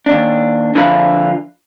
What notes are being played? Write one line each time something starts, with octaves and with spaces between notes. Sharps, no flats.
D#2 D4
D3 F3 D4 F4 E5 B5